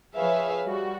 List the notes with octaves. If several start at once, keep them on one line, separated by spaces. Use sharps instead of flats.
F3 G#4 B4 C#5 E5 F5
G3 F#4